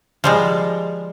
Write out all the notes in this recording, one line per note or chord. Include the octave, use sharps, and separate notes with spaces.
F3 G3 G#3